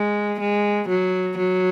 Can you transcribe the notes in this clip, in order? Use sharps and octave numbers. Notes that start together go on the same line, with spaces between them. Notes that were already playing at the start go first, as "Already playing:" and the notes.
Already playing: G#3
G#3
F#3
F#3